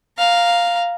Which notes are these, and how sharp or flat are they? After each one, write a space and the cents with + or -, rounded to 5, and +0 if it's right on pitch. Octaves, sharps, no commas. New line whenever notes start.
F5 +0 A#5 +0